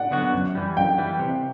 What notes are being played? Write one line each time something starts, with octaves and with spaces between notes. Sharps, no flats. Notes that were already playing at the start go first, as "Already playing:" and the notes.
Already playing: D5 F#5
D3 F#3 B3 F#4
F#2
E3 G3
F#2 G5
E3 G3
C3